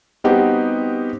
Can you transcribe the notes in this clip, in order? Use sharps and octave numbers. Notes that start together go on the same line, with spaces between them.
G3 B3 C4 D#4 F#4 G4